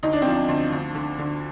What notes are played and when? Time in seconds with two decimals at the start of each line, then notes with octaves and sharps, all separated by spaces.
0.03 D2 D#4
0.13 D4
0.22 C4
0.26 F3 D4
0.48 D2
0.72 D2
0.95 D3
1.18 D3